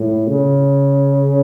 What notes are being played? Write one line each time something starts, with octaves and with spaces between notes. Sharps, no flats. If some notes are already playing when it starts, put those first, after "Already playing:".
Already playing: A2
C#3